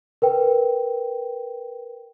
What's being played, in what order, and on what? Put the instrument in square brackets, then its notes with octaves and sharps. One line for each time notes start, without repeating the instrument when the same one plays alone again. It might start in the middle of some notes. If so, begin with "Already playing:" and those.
[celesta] A#4 B4 G5